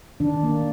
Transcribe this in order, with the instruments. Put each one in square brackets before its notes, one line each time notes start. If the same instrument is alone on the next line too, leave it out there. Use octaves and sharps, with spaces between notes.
[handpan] D#3 D4
A#3